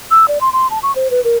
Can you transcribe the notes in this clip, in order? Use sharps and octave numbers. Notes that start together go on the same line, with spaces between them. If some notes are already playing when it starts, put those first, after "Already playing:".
E6
D5
C6
C6
A5
C#6
C5
B4
A#4